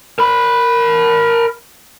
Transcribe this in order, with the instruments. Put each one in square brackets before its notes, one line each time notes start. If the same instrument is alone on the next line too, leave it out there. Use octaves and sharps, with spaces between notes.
[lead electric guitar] A#4 B5